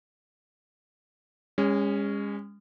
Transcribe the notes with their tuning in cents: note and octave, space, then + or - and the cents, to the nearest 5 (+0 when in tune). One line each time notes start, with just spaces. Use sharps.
G#3 -35 C#4 +0